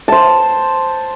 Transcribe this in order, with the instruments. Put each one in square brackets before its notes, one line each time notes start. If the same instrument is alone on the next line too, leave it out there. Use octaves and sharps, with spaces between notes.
[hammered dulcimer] C5 A5